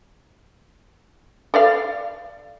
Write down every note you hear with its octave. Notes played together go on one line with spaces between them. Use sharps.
A4 D5 F5